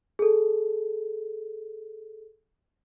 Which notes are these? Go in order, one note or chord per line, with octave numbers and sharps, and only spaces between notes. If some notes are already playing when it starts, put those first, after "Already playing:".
G#4 A4